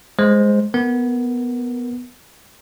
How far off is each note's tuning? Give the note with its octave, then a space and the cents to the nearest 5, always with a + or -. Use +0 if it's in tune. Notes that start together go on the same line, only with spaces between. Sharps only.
G#3 +0 C5 +0
B3 +0 A#4 +0